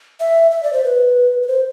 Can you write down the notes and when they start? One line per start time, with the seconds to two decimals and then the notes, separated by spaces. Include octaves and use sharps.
0.20 E5
0.51 E5
0.63 D5
0.73 C5
0.84 B4
1.42 B4
1.48 C5